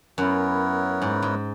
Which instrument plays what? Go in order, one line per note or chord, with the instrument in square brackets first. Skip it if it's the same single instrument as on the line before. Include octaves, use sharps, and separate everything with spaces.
[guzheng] F#2 [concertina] B3 E4 A#4 C#5 F#5
[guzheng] G#2
G#2